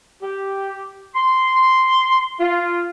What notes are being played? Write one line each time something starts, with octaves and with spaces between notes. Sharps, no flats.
G4
C6
F4